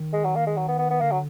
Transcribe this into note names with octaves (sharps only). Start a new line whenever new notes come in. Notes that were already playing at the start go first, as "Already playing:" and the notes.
Already playing: D#3
G#3
F#3
A#3
G#3
F#3
B3
B3
B3
D3 A#3
F#3